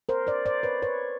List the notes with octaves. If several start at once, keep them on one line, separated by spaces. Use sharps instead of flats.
A#4 C5
C5 D5
C5 D5
B4 C#5
B4 C#5